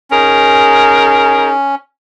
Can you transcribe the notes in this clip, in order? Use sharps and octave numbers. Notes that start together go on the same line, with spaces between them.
C#4 D#4 G#4 A#4